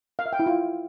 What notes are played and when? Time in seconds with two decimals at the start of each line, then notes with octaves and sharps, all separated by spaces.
0.19 F5
0.26 E5
0.33 G5
0.39 E4
0.46 F4